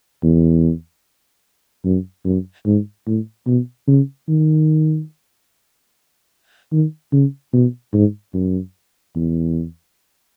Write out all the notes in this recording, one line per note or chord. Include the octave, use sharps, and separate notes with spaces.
E2
F#2
F#2
G#2
A2
B2
C#3
D#3
D#3
C#3
B2
G#2
F#2
E2